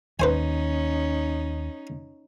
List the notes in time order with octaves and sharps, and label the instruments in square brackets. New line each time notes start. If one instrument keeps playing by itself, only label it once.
[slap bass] D#2 [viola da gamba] C#4 D#4 [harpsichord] B4 C5 G#5